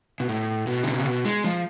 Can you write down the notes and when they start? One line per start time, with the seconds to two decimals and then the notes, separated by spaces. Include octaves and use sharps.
0.20 B2
0.29 A2
0.67 B2
0.83 D3
0.94 C#3
1.06 B2
1.25 G#3
1.44 F3